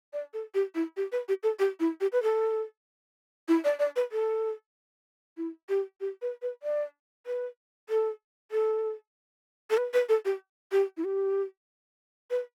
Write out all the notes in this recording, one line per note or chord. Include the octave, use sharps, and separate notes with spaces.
D5
A4
G4
E4
G4
B4
G4
A4
G4
E4
G4
B4
A4
E4
D5
D5
B4
A4
E4
G4
G4
B4
B4
D5
B4
A4
A4
A4
B4
B4
A4
G4
G4
E4
G4
B4